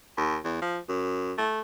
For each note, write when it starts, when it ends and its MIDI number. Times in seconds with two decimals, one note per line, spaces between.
0.17 0.37 39
0.44 0.57 40
0.61 0.78 53
0.89 1.33 42
1.38 1.61 57